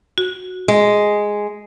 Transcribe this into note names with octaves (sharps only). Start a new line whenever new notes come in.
F#4
G#3